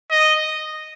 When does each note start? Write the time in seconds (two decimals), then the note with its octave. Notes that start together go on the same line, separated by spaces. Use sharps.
0.11 D#5